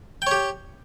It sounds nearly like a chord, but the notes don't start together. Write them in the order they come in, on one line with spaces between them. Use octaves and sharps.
G5 C#5 G4